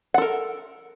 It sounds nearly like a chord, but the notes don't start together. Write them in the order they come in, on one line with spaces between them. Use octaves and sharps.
F#5 A4 A#4